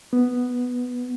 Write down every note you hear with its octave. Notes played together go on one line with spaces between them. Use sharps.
B3